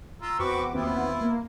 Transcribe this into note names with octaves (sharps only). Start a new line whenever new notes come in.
F4 A#5 E6
E2 C4 F#4 B4 C#6 D6
D#2 B3 C4 E4 F4
A#3